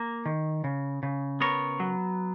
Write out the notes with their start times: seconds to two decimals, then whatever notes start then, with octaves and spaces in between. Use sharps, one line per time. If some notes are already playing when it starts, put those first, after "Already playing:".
Already playing: A#3
0.26 D#3
0.64 C#3
1.03 C#3
1.41 B3 A#4 C#5
1.80 F#3